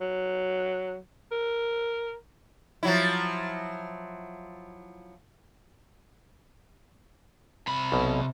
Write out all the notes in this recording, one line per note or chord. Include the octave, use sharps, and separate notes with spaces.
F#3
A#4
F3 F#3 E4
C3 B5
B1 B2